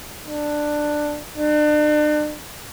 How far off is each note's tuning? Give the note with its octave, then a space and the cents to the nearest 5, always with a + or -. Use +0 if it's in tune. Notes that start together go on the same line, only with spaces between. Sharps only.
D4 +10
D4 +40